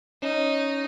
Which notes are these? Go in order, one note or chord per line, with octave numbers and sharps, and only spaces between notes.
C#4 D#4